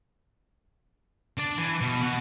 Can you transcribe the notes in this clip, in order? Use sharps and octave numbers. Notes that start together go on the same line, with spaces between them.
D4 D5
E3
B2
B2 F#5